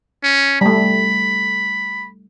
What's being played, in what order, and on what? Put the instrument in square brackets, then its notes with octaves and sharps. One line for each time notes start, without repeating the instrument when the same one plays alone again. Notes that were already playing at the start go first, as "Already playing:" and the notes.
[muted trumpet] C#4
[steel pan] G3 A3 [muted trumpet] B5